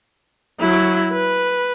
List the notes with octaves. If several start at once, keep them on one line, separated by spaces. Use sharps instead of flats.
F#3 E4
B4